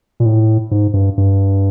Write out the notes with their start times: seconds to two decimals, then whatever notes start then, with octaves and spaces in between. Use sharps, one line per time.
0.20 A#2
0.26 A2
0.71 G#2
0.93 G2
1.18 G2